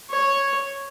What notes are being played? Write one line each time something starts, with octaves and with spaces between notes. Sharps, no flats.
C#5